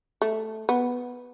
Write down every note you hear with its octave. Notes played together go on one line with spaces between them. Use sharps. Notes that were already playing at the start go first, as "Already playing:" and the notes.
A3
B3